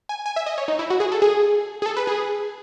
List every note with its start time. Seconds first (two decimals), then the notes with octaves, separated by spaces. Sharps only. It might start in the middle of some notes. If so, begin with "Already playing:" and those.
0.09 G#5
0.26 G#5
0.36 E5
0.46 D#5
0.58 C#5
0.68 D#4
0.79 E4
0.90 F#4
1.00 G#4
1.12 A4
1.22 G#4
1.82 G#4
1.86 A4
1.97 B4
2.07 G#4